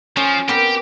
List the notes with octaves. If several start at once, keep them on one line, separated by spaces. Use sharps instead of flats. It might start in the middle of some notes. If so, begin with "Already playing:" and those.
F3 C#4
B3 C4 G4 A#4